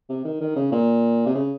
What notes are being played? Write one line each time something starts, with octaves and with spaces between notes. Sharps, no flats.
C3
D#3
D#3
C#3
A#2
C3
C#3